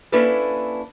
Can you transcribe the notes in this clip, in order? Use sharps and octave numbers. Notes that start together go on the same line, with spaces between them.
A#3 C#4 D4 E4 A4 B4